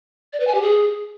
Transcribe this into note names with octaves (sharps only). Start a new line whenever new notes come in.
D5
B4
G#5
G4
G#4